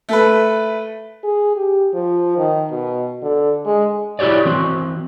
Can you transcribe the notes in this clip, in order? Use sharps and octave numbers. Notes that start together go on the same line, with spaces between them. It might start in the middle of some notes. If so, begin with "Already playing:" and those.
A3 A4 B4
G#4
G4
F3
D#3
B2
D3
G#3
E4 F#4 G4 C#5 D5
E3 C4 F#4